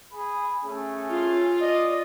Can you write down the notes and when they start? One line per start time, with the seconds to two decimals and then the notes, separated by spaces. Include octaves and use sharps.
0.12 G#4 B5
0.64 A3 C#4 G#4
1.11 F4
1.62 D5 D#5